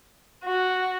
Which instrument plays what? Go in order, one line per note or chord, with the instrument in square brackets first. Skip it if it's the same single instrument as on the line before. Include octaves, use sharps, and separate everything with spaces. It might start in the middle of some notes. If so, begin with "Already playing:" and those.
[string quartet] F#4